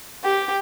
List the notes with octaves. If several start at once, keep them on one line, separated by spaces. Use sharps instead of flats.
G4